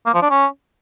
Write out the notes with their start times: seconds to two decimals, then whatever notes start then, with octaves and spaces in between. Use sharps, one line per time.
0.06 A#3
0.14 F3
0.22 D4
0.31 C#4